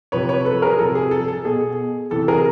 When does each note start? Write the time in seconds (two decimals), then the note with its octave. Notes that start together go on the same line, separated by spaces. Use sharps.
0.12 C3 F3 B4 C#5
0.29 B4 C#5
0.45 A4 B4
0.62 G#4 A#4
0.79 C3 F3 A4
0.95 G#4
1.11 A4
1.28 A4
1.45 B2 G#4
2.11 C3 E3 A4
2.28 G#4 A#4